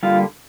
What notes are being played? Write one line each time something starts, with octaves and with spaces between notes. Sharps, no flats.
D3 G3 A#3 F4